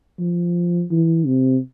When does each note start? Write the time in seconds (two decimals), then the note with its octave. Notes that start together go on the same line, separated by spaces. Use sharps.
0.19 F3
0.91 E3
1.26 C3